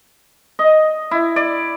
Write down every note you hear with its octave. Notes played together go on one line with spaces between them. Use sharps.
D#5
E4
D5